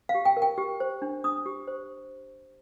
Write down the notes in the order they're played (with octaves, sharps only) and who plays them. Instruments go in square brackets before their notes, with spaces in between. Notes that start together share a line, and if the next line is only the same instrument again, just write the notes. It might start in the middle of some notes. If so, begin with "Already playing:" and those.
[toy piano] F5
G4
G5
A#4
G5
G4
C5
D4
D4 D#6
G4
C5